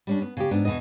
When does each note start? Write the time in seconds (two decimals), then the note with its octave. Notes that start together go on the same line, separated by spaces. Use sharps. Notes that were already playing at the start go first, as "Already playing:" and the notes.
0.07 G3 C#4 D4
0.22 B3
0.37 C#3 G4
0.51 G#2 B3 D4
0.65 E2 G#2 B2 B3 D#5